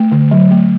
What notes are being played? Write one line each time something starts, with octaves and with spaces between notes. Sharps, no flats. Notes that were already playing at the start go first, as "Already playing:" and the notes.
Already playing: A3
D3
F#3
A3